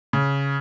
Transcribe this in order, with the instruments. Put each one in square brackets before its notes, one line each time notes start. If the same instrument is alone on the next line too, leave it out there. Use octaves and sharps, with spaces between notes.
[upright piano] C#3